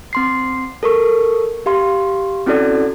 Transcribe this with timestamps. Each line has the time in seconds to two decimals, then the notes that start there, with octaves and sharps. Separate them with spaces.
0.13 C4 C6 C7
0.83 A4 A#4 C#6
1.66 G4 F5 C6
2.46 C4 C#4 E4 F#4 A4 D5